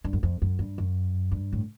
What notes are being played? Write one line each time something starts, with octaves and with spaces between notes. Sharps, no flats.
G2
F#2
F2
F#2
G2
F#2
G2
A2